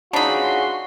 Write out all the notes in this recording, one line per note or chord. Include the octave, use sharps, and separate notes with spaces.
D4 D#4 F4 F#4 G#4 C#5 B5
C6